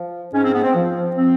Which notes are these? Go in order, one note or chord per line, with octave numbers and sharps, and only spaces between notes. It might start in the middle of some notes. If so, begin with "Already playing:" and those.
Already playing: F3
G#2 C#4
C4
B3
C4
F3
C4